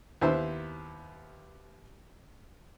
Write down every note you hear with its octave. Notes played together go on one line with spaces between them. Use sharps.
D#2 B3 E4 C5